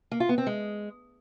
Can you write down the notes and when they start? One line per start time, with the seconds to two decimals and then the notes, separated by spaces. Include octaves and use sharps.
0.11 A#3
0.20 F4
0.29 B3
0.38 C4
0.47 G#3